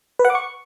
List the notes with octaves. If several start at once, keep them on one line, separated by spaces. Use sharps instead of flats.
B4
F#5
D6
C#6